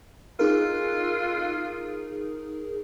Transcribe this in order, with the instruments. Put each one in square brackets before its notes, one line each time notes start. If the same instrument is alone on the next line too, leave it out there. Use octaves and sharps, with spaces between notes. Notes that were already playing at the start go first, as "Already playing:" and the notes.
[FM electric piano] D#4 G#4 A#4 [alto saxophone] F4